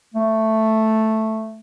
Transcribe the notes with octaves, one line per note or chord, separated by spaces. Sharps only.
A3